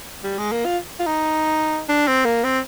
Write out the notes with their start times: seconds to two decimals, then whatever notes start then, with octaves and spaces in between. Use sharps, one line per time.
0.24 G3
0.38 G#3
0.52 A#3
0.65 F4
0.99 F4
1.06 D#4
1.88 D4
2.07 C4
2.25 A#3
2.44 C4